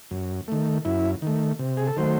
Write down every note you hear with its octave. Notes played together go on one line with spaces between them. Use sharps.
F#2
D#3 A3
F#2 E4
D#3 A3
C3
G#4
A4
D#3 F#3 A3 C5